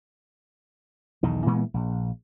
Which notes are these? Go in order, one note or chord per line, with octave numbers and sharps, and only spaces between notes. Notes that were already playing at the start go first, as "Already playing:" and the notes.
B1 E2 D#3
A#2 E3 G#3 B3
A#1